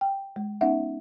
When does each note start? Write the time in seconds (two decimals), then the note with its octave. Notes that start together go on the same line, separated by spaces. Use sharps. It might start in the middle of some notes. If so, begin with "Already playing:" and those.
0.01 G5
0.36 G#3
0.61 B3 C#4 D#4 E5 F#5